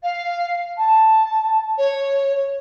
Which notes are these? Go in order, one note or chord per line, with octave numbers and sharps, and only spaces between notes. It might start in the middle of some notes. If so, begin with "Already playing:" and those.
F5
A5
C#5